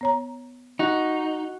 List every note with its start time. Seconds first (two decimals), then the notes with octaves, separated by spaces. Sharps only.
0.01 B3 C#5 A#5
0.79 D#4 F#4